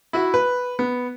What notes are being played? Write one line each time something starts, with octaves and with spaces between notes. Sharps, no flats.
E4 F#4 E5
B4
B3